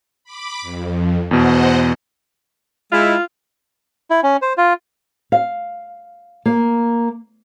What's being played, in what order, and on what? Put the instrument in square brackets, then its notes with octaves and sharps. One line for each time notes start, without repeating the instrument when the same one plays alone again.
[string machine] B5 D6
F2
[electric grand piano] E2 B2 [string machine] C5 D#5 F#5
[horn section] G#3 E4 [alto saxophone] F4
[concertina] E4
C#4
C5
F4
[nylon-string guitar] F5
A#3